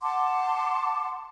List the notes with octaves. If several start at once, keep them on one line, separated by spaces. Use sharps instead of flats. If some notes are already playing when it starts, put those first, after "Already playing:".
F#5 A5 C6 D6